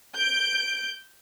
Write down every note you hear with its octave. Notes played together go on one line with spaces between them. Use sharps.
G6 D7